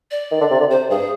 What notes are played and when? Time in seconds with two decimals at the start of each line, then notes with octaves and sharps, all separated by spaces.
0.11 D5
0.31 D#3
0.41 D3
0.51 C3
0.60 D3
0.70 C3 C5
0.90 G2 G#4